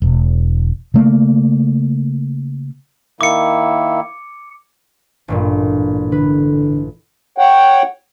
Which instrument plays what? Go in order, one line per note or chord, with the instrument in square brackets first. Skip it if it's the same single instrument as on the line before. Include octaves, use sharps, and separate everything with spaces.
[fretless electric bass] E1
C#3 A3 A#3
[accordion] D#3 A#3 E4 [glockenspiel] D6 C#7
[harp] A1 G2 A#2
[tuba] D3 [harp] B4
[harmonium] C#5 F#5 G5